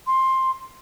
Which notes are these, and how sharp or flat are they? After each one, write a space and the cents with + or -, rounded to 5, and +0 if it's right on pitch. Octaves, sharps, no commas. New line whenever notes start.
C6 +10